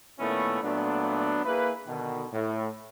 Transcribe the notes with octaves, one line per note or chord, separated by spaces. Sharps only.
A#2 D#3 A3 B3 C#4 E4
A#2 F#3 A3 B3 D4
A#3 E4 G#4 B4
B2 D3 D#3
A2